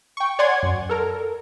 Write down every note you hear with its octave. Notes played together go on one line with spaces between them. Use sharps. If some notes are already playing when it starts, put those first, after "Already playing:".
G5 C#6
C#5 D5 F#5 G#5 C6 G#6
F#2
A4 A#4